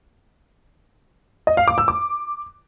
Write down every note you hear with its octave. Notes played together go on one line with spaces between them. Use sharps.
D#5
F5
D6
E6
D6